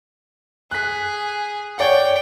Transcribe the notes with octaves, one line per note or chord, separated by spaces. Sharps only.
G#4 F#6 B6
C#5 D5 F#5 G5